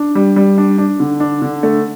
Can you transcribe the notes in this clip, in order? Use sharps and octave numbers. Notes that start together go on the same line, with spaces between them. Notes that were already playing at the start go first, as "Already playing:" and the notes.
Already playing: D4
G3
G3
D4
D4
D3
D4
D3
A3